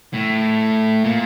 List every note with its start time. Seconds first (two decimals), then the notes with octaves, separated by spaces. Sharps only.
0.13 A2
1.04 A#2